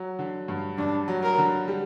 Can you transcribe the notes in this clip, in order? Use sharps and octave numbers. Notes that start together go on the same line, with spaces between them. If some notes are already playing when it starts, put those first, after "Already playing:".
Already playing: F#3
D3
G2
G2 D4
F#3
A#4
D3
G3